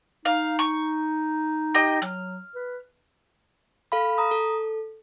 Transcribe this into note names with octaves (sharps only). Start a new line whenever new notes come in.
D#4 F5
C#6
G4 D#5 G5
F#3 F6
B4
A4 F5 B5
A#5 D#6
A4